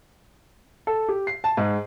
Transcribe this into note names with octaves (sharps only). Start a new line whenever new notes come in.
A4
G4
C7
A5
G#2